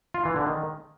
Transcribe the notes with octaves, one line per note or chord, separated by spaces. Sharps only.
F4
E3
D3
D#3